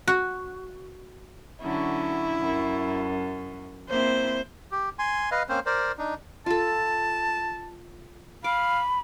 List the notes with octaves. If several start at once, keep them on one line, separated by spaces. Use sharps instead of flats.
F#4
D3 F#3 C#4 E4
F#2
A#3 C4 E4 C5
G4
G#5 C6
B4 D#5 F5
A#3 C4 C#4 C5
A#4 C5 D5
D4 D#4
F4 A4 A5
F5 B5 D6